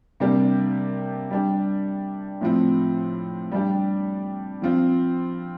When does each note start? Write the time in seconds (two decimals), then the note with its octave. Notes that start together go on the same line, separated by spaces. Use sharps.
0.20 C3 G3 A#3 D4 G4
1.31 G3 D4 G4
2.41 A2 F3 C4
3.52 G3 D4 G4
4.62 F3 C4 F4